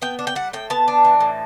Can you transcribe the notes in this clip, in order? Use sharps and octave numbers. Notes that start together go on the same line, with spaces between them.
B3 G5
D4
G5
G3 F#5
A2 G5
B3 A5
D4
E3
A2